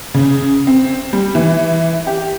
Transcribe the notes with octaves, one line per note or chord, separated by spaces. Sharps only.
C#3
C4
G3
E3
G4